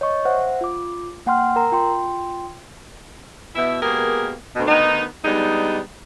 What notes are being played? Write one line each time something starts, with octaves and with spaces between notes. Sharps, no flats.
C#5 D#5 C#6
C5 E5 F#5
F4 D6
A#3 F#5 G5 C6 F6
A#4 A#5
F4 G5 C6
B2 E4 E5
B2 G#3 A#3 G4 G#4 A#4
D2 B2
D2 D#3 B3 D#4
G3 G#3 B3 D4 D#4